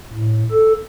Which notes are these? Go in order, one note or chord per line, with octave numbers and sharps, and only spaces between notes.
A2
A4